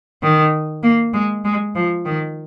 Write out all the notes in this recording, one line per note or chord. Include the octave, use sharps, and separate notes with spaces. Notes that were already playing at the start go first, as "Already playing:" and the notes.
D#3
A#3
G#3
G#3
F3
D#3